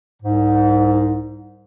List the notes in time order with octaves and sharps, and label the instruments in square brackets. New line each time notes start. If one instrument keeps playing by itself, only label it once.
[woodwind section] C2 G#2